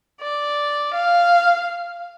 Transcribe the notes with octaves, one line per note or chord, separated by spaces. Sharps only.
D5
F5